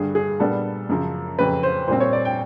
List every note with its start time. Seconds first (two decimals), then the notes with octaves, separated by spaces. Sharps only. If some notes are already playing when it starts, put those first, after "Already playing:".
Already playing: G2 D3 G3 G#4
0.15 G#4
0.40 A#2 G3 B3 D4 A4
0.89 F#2 C#3 F3
1.39 F2 C#3 F#3 B4
1.63 C5
1.88 A#2 G3 C4 C5
2.00 C#5
2.13 D5
2.25 G5